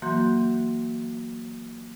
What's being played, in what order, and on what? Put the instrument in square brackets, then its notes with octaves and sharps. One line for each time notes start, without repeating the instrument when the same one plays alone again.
[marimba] E3 F#3 A#3 F#4 C6 G6